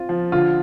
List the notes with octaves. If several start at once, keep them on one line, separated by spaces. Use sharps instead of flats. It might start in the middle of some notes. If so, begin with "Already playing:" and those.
Already playing: C4 F4
F3
D3 F4